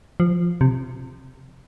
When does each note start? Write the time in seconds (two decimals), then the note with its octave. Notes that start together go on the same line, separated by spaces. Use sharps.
0.20 F3
0.61 C3